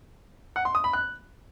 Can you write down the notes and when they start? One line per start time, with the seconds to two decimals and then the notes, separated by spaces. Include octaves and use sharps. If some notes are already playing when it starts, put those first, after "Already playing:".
0.56 F#5
0.65 C6
0.75 D#6
0.84 B5
0.93 F#6